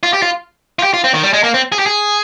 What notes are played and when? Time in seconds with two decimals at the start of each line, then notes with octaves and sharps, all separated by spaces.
0.03 F4
0.13 G4
0.22 F4
0.79 F4
0.83 G4
0.94 F4
1.04 C4
1.14 D#3
1.23 G3
1.33 G#3
1.44 A#3
1.54 C4
1.72 G#4
1.79 G4
1.86 G#4